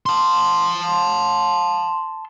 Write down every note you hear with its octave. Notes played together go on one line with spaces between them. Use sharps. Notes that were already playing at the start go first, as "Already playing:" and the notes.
A5 C6